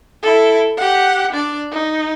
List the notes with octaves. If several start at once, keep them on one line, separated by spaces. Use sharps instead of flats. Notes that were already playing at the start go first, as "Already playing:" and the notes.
E4 A4
G4 F#5
D4 D5
D#4